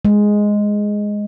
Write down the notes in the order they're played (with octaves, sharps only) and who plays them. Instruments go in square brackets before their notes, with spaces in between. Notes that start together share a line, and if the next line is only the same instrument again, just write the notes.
[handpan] G#3